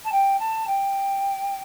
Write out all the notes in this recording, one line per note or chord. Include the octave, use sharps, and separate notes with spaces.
A5
G5
A5
G5